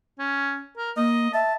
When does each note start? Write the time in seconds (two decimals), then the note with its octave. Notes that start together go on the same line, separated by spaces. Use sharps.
0.19 C#4
0.77 A#4
0.97 A#3 D#5
1.33 E5 A5